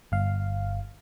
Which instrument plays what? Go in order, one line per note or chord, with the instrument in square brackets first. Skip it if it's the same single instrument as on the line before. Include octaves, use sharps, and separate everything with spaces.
[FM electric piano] G1 F5